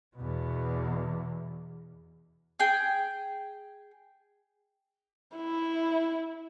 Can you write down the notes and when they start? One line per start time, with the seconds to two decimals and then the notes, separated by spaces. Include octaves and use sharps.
0.16 E2 B2
2.60 G#4 G5
5.36 E4